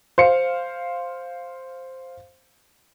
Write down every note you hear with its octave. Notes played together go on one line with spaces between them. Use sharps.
C5 F5 C#7